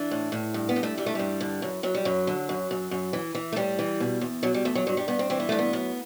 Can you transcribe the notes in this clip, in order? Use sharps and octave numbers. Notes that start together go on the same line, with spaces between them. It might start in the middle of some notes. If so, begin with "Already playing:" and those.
Already playing: E3 D4
A2
A2
G2
B3
G2
A3
E3 G3
A3
G2 G3
D3
F#2
F#2 F#3
G3
F#2 F#3
D3
F#2
F#2
F#2
E3
E3
A3
A2 G3
E3
B2
E2
B2 F#3
G3
E2 A3
F#3
G2 F#3
G3
G2 B3
C4
E3 C4
B3
G2 A3
B3
F#2